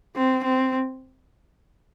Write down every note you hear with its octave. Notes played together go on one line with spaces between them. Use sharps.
C4
C4